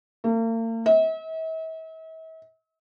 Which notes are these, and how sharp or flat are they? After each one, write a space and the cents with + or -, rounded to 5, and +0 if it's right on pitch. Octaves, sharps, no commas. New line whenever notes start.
A#3 -45
E5 -45